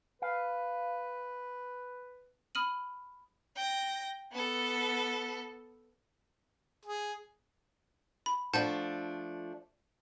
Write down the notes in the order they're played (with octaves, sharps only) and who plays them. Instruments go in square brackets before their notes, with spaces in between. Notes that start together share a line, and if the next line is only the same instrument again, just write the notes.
[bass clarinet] B4 [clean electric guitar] F5
[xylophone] B5 D#6 F6 D#7 F#7
[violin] G5 A#6
B3 A4
[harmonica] G#4
[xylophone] B5
[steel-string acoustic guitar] F3 A3 D4 [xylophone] F#5 A5 G6